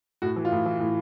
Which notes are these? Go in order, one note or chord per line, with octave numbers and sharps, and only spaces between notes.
A2 F#4
E3
F4
A2
E3
A2